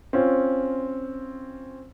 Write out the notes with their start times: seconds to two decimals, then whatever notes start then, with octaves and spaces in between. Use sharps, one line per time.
0.13 C4 C#4 F4